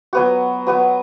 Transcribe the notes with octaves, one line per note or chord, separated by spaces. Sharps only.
F#3 B3 F#4
F#3 B3 F#4